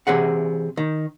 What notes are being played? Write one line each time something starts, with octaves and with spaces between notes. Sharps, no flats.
C3 E3 G#4 F#5
D#3